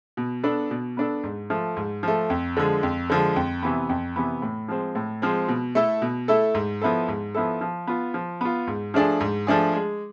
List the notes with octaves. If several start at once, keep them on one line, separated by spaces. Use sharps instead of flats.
B2
B3 D4 A4
B2
B3 D4 A4
G#2
F3 A3
G#2
F3 A3
F2
D3 F3 G#3
F2
D3 F3 G#3
F2
C3 E3 B3
F2
C3 E3 B3
A2
F3 G#3 C4
A2
F3 G#3 C4
B2
A3 E4 A4
B2
A3 E4 A4
G#2
F3 B3 E4 A4
G#2
F3 B3 E4 A4
F3
B3 F4
F3
B3 F4
G#2
F3 A3 D4 G#4
G#2
F3 A3 D4 G#4
G#3